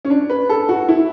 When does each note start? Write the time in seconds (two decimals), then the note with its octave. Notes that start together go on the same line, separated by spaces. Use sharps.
0.05 C#4
0.10 D4
0.30 B4
0.49 A4
0.69 F#4
0.89 E4